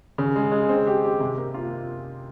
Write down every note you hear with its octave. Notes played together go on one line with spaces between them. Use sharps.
C#3
G#3
G#3
C4
G4
G4
C3
A#3
F4